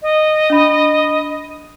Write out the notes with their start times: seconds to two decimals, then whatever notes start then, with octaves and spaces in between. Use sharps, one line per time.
0.02 D#5
0.50 D4 E5 B5